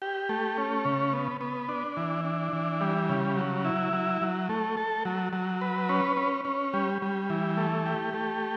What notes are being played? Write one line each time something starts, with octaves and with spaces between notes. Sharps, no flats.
G4
A3
C#4
C#3
B3
B3
D4
E3
D4
E3
G3
C#3
F#3
E4
F#3
F#3
A3
A4
F#3
F#3
B4
C#4
C#4
C#4
G3
G3
E3
A3
G4
A3